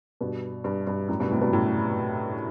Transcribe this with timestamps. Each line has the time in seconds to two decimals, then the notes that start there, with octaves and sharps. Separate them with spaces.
0.21 G2 B2
0.64 G2
0.87 G2
1.08 F#2 A2
1.20 G2 B2
1.31 A2 C3
1.42 G2 B2
1.53 F#2 A2